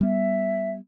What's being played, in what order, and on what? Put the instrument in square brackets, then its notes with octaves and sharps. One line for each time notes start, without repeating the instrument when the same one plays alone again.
[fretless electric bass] G3 B3 [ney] E5